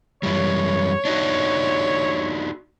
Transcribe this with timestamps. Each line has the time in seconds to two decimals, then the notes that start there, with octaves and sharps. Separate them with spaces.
0.23 F#2 E3 G3 C#5
1.05 D4 D#4 F#4